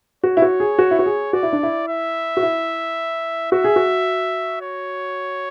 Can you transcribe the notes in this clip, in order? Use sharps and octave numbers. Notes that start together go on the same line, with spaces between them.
F#4 C#5
E4
F#4
G#4
F#4
E4
F#4
G#4
F#4 D5
E4
D4
E4
E5
F#4
E4
F#4 E5
G#4
F#4
C#5